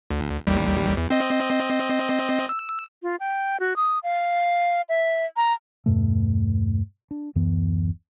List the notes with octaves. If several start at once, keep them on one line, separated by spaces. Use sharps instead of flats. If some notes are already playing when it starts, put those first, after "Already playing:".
D2
A1 D#2 G3
E2
C4 D#5
E6
F4
G5
F#4
D#6
F5
E5
A#5
E2 G2 B2 A3
D4
D1 F#2 E3 B3